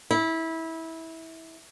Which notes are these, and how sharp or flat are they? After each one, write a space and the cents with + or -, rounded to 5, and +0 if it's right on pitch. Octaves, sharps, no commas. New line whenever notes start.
E4 -20